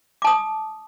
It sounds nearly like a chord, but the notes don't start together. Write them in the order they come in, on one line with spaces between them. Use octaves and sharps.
D6 A5 D#6